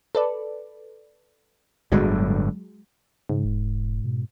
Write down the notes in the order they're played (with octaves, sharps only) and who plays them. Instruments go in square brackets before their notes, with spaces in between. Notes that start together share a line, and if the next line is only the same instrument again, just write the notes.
[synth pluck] A4 B4 D5
[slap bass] G1 A2 D3 [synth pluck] F#3 G#3
[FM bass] G#2 [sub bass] C#3
[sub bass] E1
B2